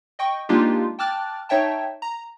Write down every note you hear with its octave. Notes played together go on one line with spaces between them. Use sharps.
D#5 G5 C#6
G#3 A#3 D4 D#4 F4 G4
G5 A5 D6 F6 F#6 A6
D#4 C#5 E5 G5 A5
A#5